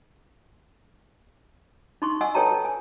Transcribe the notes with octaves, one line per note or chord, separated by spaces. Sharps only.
D#4 C6 C#6
D#5 F#5 G#5 E6
A4 B4 C#5 G5 A5 A#5
G#5